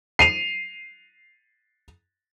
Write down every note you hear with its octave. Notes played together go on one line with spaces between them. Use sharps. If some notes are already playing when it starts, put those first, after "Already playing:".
C7 D#7 F7